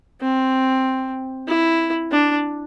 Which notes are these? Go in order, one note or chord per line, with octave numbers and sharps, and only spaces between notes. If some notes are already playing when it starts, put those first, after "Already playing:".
C4
E4
D4